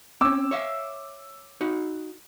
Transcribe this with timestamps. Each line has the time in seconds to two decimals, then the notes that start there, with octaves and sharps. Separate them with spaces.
0.21 C4 C#4 D6 E6
0.51 C#5 E5 F5
1.61 D#4 F#4